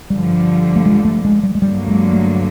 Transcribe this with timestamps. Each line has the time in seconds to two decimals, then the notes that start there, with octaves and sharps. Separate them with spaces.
0.10 G2 D3 F3 G3
0.76 A3
0.86 G#3
1.05 A3
1.25 G#3
1.43 G3
1.55 G#3
1.62 G2 D3 F#3 G3 A#3
1.88 G#3
2.13 A3